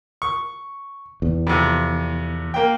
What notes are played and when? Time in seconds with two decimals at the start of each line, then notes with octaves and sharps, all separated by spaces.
0.22 C#6
1.22 E2
1.47 F2 C3
2.54 A#3 G5